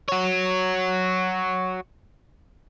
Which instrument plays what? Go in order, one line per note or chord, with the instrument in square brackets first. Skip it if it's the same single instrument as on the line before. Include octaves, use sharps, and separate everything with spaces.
[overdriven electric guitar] F#4 C#5